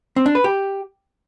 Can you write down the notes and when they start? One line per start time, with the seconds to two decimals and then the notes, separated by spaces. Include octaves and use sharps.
0.16 C4
0.26 D4
0.35 B4
0.44 G4